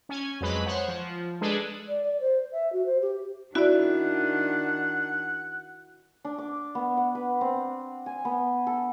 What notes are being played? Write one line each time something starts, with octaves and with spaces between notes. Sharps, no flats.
C#4 G#5
F2 F#3 G#3 B4 B5
C5 C#5 F#5
F3
G#3 D4 G#4 A4 B4
D5
D5
C5
E5
F#4
C5
G4
D#3 D4 E4 F#4 D5 F#5
D4
D6
B3
F#5
B4
C4
G#5
B3
A4